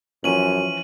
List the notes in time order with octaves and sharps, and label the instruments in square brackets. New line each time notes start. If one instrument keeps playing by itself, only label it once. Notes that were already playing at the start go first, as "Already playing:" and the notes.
[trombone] F#2 [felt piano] E3 F3 C#4 [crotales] D#7 F#7